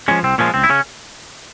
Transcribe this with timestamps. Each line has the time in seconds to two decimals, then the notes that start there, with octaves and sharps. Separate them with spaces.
0.08 F3 G#3 C#4
0.23 C2 C4
0.38 A#2 F3 G#3 C#4
0.54 C#2 C4
0.64 E4
0.69 C#3 C#4